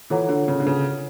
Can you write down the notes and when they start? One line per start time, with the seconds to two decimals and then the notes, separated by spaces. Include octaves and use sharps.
0.10 E3 F4 A4 C#5 F#5 A#5
0.29 D3
0.48 C#3
0.60 D3
0.66 C#3